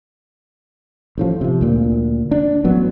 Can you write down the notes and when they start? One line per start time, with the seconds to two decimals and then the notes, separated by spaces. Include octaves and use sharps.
1.18 A1 A2 F3
1.41 C3 F3
1.61 D2 A#2
2.31 D4
2.64 A1 F#3 B3